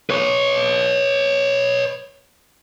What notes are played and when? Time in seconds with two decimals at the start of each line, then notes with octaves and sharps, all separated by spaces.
0.10 B4 C#5